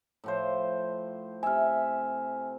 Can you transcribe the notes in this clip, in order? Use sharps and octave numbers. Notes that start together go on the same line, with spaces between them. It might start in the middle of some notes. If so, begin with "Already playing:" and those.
A2 F3 C5
C3 E5 G#5 F6